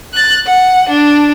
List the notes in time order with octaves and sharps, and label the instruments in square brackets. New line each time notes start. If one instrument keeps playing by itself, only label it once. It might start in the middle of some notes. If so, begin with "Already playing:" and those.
[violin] F#6 A6
F#5
D4